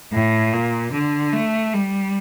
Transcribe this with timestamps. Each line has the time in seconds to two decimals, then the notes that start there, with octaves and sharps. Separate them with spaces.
0.13 A2
0.53 A#2
0.93 D3
1.33 A3
1.73 G3